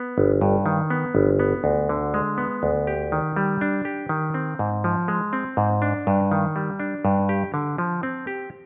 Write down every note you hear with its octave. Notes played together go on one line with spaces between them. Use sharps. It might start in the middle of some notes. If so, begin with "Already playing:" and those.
Already playing: B3
G1
G2
D#3
B3
G1
B3
D2
D3
G#3
B3
D2
G4
D#3
G3
D4
G4
D#3
C4
G#2
F3
G#3
C4
G#2
D4
G2
D#3
G3
D4
G2
G4
D3
F3
C4
G4